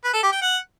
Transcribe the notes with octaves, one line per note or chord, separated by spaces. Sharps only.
B4
A4
G4
G5
F#5